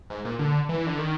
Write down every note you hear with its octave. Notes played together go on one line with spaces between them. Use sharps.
G#2
A#2
D3
E3
D3
D#3